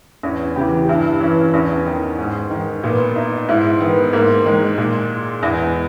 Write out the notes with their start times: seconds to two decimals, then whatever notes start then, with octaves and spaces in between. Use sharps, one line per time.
0.23 E2 C#4
0.56 C#3 E3 G4
0.83 G4
0.89 G2 E4
1.21 E3 C#4
1.54 E2 C#4
1.86 D#3
2.18 G#2
2.51 D#3
2.83 A#2 B3
3.16 D#4
3.49 G#2 E4
3.81 D#3 B3
4.13 G#2 A#3
4.46 D#3 G#3
4.78 A#2
5.43 E2